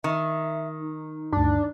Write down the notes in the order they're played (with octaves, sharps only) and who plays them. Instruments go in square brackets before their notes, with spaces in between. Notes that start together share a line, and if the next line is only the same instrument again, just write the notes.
[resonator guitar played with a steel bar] D#3 [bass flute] E5
[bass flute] D#4
[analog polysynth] D2 G2 [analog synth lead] D4